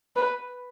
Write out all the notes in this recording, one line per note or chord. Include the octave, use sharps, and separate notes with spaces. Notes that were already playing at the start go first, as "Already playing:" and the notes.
B4